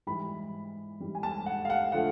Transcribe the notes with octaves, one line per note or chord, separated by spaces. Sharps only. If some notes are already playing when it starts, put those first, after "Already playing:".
G#2 E3 G3 B5
G#2 E3 G3
G#5
A5
F#5
F5
F#5
D3 F3 A3 F#5